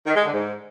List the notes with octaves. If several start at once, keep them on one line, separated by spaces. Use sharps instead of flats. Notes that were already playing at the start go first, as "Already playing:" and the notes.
D#3
G#3
D3
G#2